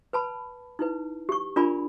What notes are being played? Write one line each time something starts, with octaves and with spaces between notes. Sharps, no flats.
B4 A5 B5
D#4 E4 B4
G4 C#6
D4 F4 A#4 D5 G#5 B5